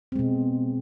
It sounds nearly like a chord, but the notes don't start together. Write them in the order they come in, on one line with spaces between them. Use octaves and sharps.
C4 G#3 B2